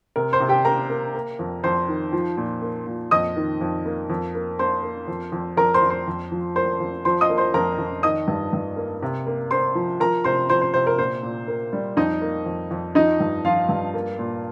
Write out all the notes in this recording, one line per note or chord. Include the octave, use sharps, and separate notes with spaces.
C3 A#4
C5 C6
C3
G4 G5
A#3 A#4 A#5
A#3
A#3
F2
F2 C5 C6
D#3
F3
A#2
A#3
A#2
F2 D#5 D#6
D#3
F2
A#3
F2
A#3
A#3 C5 C6
A#3
F2
F2
F2 A#4 A#5
C5 C6
F2
C5 C6
F2
F3
A#3 C5 C6
F2
F3 C5 C6
D#5 D#6
A#3
C5 C6
F2 A#4 A#5
F2
D#3 D#5 D#6
G2
G2
A#3
C3
A#3
A#3 C5 C6
F3
F3 A#4 A#5
C3 C5 C6
F3 C5 C6
C5
C3 C5
A#4
A#2 C5
A#2
A#3
G3
F2 D#4 D#5
A#3
F2
F2
F3 D#4 D#5
G2
F3 F4 F5
G2
A#3
A#2